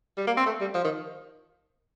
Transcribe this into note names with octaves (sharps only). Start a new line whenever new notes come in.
G3
A#3
C4
A3
G3
F3
D#3